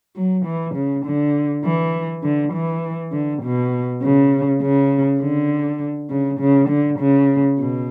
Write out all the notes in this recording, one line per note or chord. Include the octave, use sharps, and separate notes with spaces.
F#3
E3
C#3
D3
E3
D3
E3
D3
B2
C#3
C#3
D3
C#3
C#3
D3
C#3
B2